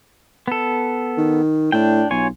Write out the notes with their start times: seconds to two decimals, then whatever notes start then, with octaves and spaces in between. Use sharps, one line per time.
0.48 B3 A4
1.18 D#3
1.72 A2 D4 G5
2.11 B1 F4 C#5 G#5